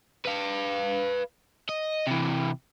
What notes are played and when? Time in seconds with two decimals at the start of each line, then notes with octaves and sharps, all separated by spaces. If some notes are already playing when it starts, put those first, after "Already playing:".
0.25 B4 F5
1.69 D#5
2.07 C3 E3